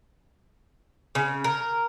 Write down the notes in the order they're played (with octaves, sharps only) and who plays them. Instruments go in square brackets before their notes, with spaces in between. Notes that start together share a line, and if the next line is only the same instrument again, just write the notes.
[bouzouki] C#3
A#4